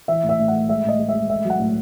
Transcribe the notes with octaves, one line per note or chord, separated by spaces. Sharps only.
E3 E5
A2
E5
A2
A3 F#5
G#3 E5
A2 D#5
G#3
E5
G#3
A3 E5
F#3
F#5
A2